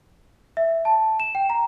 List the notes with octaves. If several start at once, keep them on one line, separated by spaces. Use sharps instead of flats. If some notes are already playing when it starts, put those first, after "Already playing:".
E5
A5
E7
G5
A#5